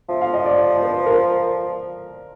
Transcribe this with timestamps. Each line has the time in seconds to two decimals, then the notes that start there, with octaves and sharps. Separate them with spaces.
0.09 F3 E5
0.21 F5
0.34 D#5
0.46 D5
0.77 C5
0.83 B4
1.06 A#4